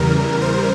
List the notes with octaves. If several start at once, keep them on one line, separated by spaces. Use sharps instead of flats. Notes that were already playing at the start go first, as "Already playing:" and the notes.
Already playing: E2 C#3 E3 G3 A#4
C5